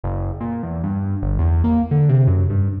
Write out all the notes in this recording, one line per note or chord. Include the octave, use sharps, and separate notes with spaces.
F#1
A#2
E2
G2
G1
E2
A#3
D3
C3
F#2
G2